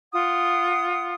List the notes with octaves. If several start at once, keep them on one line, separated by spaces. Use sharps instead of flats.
F4 F#5 D#6